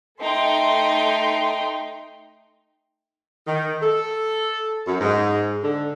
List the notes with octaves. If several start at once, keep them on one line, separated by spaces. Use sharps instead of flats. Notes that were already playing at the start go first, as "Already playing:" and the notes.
A3 D#4 G5 C6
D#3
A4
F#2
G#2
D3